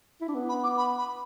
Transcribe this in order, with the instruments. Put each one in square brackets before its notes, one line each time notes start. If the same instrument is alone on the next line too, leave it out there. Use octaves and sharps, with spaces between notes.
[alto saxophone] E4
D4
B3
[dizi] B5
D6
B5
B5